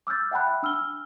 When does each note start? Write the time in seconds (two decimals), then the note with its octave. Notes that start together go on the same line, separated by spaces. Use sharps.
0.07 D6 E6 F6 G6 A6
0.31 E5 F#5 G5 A5 B5 F#6
0.63 D4 E6 F6 G7